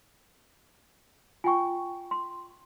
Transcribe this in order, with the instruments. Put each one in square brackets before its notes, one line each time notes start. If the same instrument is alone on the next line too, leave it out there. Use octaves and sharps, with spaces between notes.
[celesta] F4 G5 [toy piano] G#5 C#6
[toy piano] C6